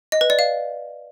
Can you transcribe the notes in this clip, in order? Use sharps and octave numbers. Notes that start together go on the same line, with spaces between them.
D#5
B4
D5
F5